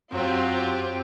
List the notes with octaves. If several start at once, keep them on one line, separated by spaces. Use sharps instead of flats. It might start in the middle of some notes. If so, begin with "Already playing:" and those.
F#2 F#3 C4 F4 G4